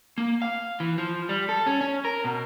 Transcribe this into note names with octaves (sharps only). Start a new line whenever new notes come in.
A#3
F5
E3
F3
G3
A4
C#4
C#4
A#4
B2